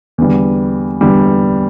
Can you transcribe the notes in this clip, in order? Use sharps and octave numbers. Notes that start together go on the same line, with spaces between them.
E2 D3 G3
E2 D3 G3